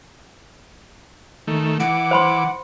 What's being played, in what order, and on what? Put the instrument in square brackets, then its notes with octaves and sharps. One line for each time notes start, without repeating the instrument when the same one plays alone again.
[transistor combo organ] D#3 A3
[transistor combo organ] E3 D6 [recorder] F#5
[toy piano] C5 B5 C6